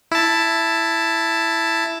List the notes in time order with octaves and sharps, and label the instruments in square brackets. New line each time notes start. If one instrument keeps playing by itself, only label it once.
[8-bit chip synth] E4 A5